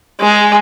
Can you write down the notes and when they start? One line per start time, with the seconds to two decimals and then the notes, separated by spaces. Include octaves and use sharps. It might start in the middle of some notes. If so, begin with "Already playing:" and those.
0.20 G#3